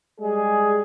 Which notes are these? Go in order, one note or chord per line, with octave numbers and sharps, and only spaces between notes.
G3 G#3 G#4